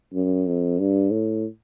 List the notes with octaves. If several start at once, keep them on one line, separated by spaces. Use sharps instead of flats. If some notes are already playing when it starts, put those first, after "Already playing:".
F#2
F2
G2
A2